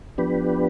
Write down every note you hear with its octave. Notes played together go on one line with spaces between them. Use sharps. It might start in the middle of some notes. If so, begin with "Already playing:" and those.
F3 B3 D4 G4 B4